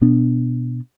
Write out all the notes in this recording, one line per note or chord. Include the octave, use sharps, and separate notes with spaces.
B2 B3 D4